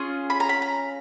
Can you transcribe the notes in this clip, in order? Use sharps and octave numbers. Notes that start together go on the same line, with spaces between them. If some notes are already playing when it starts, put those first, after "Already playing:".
Already playing: C#4 F4 G#4
B5
A#5
B5
A#5